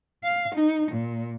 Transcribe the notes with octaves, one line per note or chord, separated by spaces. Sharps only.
F5
D#4
A#2